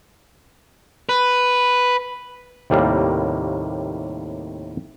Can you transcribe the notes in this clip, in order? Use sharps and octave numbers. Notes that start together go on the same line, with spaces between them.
B4
D#2 A2 C3 G3 A#3